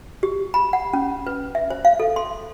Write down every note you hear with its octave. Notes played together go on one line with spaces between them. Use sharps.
G4
B5
F#5
C#4
B4
E5
C5
F5
A4
C6